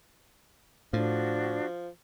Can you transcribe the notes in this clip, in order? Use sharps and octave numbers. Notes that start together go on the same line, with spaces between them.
A2 F3 D4 F#4